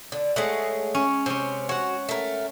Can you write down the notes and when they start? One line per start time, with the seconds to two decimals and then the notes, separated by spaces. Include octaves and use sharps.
0.12 D3
0.36 G#3 A3 G#4 C#5 F#5
0.95 C#4
1.26 C3 C#4 C5
1.69 F#4 C#5 F#5
2.09 A3 A#4